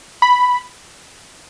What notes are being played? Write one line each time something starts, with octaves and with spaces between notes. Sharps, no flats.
B5